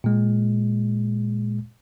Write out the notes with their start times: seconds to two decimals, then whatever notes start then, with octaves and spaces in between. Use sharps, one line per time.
0.04 A#2 G#3